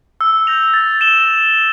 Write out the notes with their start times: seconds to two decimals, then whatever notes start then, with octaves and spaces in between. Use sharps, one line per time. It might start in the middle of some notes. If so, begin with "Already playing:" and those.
0.21 E6
0.47 G6 A#6 F7
0.74 A6
1.01 E7 G7